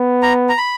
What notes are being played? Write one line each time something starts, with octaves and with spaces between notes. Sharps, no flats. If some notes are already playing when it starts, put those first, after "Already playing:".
Already playing: B3
A#5
A#5
B5